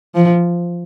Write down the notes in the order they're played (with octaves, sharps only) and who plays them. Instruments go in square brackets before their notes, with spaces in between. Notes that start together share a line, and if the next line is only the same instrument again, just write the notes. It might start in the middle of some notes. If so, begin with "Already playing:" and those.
[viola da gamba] F3